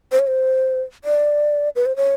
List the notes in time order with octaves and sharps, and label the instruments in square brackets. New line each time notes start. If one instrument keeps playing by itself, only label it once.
[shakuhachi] C5
C#5
C5
D5
B4
C5
C#5